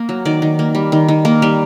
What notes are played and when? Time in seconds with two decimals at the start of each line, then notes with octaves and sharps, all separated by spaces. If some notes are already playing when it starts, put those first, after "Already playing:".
Already playing: A#3
0.09 F#3
0.25 D#3 D5
0.42 D#3
0.59 A#3
0.75 G3
0.92 D#3
1.08 D#3
1.25 A#3
1.42 G3